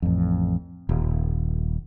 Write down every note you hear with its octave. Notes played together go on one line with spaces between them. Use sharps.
A1 F2
D#1